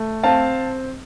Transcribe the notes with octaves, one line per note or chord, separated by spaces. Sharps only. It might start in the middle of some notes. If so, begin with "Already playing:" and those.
Already playing: A3
C4 F5 A5